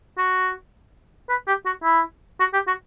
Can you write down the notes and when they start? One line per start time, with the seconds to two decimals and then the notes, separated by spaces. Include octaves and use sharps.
0.18 F#4
1.29 B4
1.47 G4
1.66 F#4
1.83 E4
2.40 F#4
2.53 G4
2.67 F#4